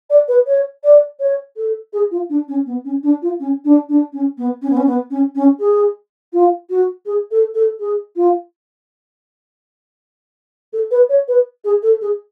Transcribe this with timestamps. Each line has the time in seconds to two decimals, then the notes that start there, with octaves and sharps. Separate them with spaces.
0.09 D5
0.28 B4
0.46 C#5
0.83 D5
1.19 C#5
1.56 A4
1.93 G#4
2.11 F4
2.29 D4
2.48 C#4
2.66 B3
2.84 C#4
3.03 D4
3.22 F4
3.39 C#4
3.64 D4
3.89 D4
4.12 C#4
4.37 B3
4.62 C#4
4.69 B3
4.76 C#4
4.86 B3
5.10 C#4
5.35 C#4
5.59 G#4
6.33 F4
6.69 F#4
7.05 G#4
7.30 A4
7.54 A4
7.79 G#4
8.16 F4
10.72 A4
10.90 B4
11.09 C#5
11.27 B4
11.64 G#4
11.82 A4
12.01 G#4